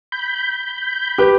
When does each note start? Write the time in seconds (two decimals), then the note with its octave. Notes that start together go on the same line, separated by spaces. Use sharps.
0.12 B5 G6
1.18 G4 B4